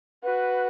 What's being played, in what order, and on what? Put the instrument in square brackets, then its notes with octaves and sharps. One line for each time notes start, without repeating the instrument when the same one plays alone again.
[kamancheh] F#4 [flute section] B4